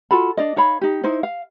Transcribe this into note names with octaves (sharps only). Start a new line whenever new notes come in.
F4 F#4 A4 B5
D4 D5 D#5
D#4 C#5 F5 B5
D#4 G4
D#4 E4 C5
F5